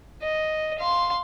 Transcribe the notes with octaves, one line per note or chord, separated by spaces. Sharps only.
D#5
F5 C6